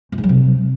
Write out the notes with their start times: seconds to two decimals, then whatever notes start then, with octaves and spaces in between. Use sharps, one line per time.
0.12 F#2
0.18 G#2
0.24 F#3
0.29 C3